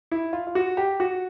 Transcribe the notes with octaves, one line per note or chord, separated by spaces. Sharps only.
E4
F4
F4
F#4
G4
F#4